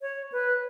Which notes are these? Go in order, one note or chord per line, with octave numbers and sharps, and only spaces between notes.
C#5
B4